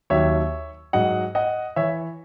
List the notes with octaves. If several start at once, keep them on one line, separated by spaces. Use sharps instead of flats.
D#2 D#3 F#3 C#5 E5
G#2 F#3 D#5 F#5
D#5 F#5
E3 C#5 E5